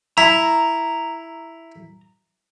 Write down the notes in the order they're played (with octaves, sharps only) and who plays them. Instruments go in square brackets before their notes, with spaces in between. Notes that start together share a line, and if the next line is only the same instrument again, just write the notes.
[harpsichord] E4 [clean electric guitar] A#5